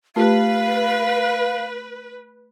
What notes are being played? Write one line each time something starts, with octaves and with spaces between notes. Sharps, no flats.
A3 F4 G4 B4 F5